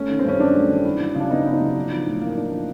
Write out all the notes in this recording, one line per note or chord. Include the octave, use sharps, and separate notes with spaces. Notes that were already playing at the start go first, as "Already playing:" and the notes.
Already playing: A3 C#4
D#3
C4
G2 C#4
F#3 D4
A3
D#3
E4
F#3
C#3 D4
B3 D#4
E4
D#4
F#3
D4
F3
A2
A#3
D4
F3